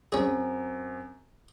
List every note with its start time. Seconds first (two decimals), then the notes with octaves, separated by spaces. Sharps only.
0.12 F#2 C4 C#4 G#4